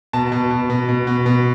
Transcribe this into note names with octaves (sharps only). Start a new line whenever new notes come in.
B2 A5
B2
B2
B2
B2
B2
B2